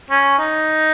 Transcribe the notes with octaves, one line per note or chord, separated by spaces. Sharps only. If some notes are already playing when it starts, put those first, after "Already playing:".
C#4
D#4